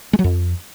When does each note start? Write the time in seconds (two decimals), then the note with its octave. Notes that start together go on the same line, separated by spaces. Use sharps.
0.13 G#3
0.19 F#3
0.24 F2